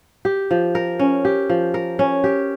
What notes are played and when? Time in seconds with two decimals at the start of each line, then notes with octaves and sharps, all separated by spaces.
0.25 G4
0.51 F3
0.75 A#4
0.99 C#4
1.25 G4
1.49 F3
1.74 A#4
1.99 C#4
2.24 G4